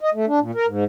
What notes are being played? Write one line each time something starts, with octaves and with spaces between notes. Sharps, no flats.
D#5
A3
D4
A#2
A#4
G#2